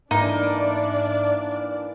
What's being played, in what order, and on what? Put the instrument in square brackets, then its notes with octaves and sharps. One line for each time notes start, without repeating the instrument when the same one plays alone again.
[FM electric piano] G#2 [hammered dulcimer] E3 A#3 [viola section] D4 D5 [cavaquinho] D#4